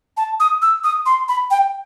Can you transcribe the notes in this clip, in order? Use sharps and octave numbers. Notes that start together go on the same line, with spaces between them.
A5
D#6
E6
D#6
C6
B5
G5